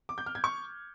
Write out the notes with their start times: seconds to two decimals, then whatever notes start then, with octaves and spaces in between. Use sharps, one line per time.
0.09 D6
0.18 G6
0.26 F6
0.35 G#6
0.44 C#6